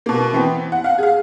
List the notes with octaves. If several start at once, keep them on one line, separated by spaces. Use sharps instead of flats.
B2 A#3
E3 B3 C4
F#5
F5 F#5
G#4 F5